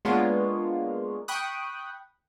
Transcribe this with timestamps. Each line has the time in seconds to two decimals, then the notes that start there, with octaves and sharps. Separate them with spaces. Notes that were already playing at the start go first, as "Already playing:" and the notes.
0.05 G#3 A#3 B3 D4 F4 C#5
1.28 G5 B5 C#6 D#6 F#6